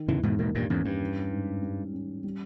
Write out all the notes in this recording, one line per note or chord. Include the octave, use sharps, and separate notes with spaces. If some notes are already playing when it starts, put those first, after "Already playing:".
Already playing: D#3
E2 C#3 E3
G#2 B2
G#2 B2 A#3
G2 A#2
E2 G#2 C#4
G2
E3
G#2
G3
C#4
G3